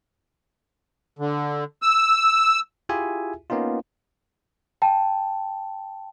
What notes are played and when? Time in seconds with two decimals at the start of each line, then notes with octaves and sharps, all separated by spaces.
1.19 D3
1.82 E6
2.89 E4 F4 G4 G#4 E5 G#5
3.50 A#3 B3 C#4 D#4 F4
4.82 G5 A5